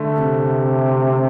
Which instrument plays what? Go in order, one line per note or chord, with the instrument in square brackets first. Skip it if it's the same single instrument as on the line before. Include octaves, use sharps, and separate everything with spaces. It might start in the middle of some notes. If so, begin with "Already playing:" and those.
Already playing: [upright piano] D3 A3
[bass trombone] C3